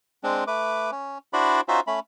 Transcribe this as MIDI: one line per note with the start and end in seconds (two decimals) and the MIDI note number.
0.24 0.44 56
0.24 0.44 60
0.24 0.44 62
0.47 0.91 57
0.47 0.91 71
0.47 0.91 86
0.92 1.18 61
1.33 1.61 62
1.33 1.61 64
1.33 1.61 66
1.33 1.61 72
1.33 1.61 74
1.33 1.61 83
1.68 1.80 61
1.68 1.80 63
1.68 1.80 65
1.68 1.80 66
1.68 1.80 72
1.68 1.80 76
1.87 2.00 57
1.87 2.00 61
1.87 2.00 83